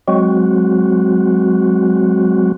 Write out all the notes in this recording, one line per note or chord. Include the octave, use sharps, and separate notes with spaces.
F#3 G#3 C4 F#4